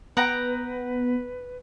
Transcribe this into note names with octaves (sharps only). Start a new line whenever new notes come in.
B3 B4 F#5 G5 A#5